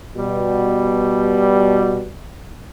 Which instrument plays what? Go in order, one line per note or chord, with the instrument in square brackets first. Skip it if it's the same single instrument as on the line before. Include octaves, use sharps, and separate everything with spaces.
[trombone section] B2 G3